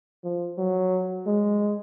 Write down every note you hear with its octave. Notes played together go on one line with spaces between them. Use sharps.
F3
F#3
G#3